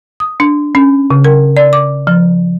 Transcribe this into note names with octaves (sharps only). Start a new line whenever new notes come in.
D#6
D4
C#4
C#3
A#4
D5
D6
F3